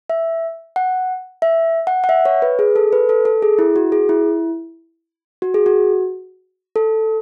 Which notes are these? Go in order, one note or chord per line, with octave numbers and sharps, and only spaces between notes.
E5
F#5
E5
F#5
F#5
E5
C#5
B4
G#4
A4
B4
A4
A4
G#4
E4
F#4
G#4
E4
F#4
G#4
F#4
A4